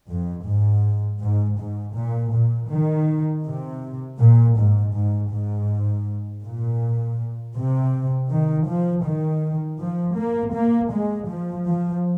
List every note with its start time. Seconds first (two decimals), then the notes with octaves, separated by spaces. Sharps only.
0.09 F2
0.47 G#2
1.21 G#2
1.59 G#2
1.96 A#2
2.34 A#2
2.70 D#3
3.45 C3
4.20 A#2
4.58 G#2
4.95 G#2
5.32 G#2
6.45 A#2
7.56 C3
8.31 D#3
8.69 F3
9.06 D#3
9.80 F3
10.18 A#3
10.55 A#3
10.93 G#3
11.30 F3
11.68 F3